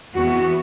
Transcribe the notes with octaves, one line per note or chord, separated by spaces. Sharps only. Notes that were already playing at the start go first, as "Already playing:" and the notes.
E2 E3 B3 F#4